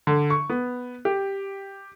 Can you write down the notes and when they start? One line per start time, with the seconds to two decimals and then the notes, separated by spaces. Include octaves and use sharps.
0.07 D3
0.30 C#6
0.50 B3
1.05 G4